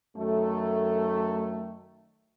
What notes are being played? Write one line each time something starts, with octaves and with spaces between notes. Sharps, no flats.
F#2 D#3 A3